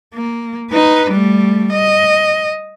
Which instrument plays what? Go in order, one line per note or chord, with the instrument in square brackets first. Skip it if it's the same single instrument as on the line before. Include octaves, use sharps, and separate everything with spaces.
[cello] A#3
D#4 B4
G3 A3
D#5